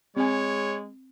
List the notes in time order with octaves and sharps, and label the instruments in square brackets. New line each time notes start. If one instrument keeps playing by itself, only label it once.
[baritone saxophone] G#3 [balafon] C4 G#5 [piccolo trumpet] C#5